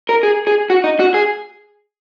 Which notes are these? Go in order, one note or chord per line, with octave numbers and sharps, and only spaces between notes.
A#4
G#4
G#4
F#4
D#4
F#4
G#4